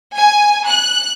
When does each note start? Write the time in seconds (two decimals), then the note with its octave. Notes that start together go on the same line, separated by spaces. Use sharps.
0.16 G#5
0.67 F#6